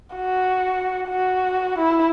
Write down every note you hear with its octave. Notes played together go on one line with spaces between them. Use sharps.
F#4
F#4
E4